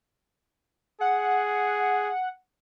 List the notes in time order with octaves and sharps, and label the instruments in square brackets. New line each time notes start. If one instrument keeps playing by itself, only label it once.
[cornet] G#4 [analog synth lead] F#5